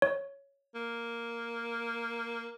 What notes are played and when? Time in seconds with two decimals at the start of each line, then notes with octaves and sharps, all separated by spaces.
0.02 C#5
0.75 A#3